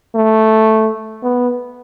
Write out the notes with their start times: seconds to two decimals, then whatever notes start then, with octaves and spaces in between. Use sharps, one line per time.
0.15 A3
1.23 B3